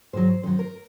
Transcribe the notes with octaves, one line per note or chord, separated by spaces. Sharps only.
G#2 D#3 F#3 C5
F#2 D#3 F#3 C5
A#4